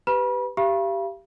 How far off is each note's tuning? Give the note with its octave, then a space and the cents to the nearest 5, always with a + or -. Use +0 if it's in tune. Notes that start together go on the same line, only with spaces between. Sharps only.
G4 +0 B4 +15 B5 -35
G4 -5 F5 -40 B5 -35